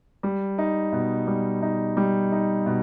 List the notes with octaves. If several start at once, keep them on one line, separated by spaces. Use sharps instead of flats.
G3
D#4
B2
G3
D#4
G3
D#4
B2